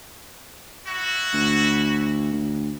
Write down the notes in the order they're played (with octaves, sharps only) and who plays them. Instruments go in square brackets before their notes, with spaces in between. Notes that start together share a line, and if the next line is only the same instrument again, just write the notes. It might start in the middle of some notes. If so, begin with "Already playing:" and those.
[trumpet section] E4 F#4
[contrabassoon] D2
D2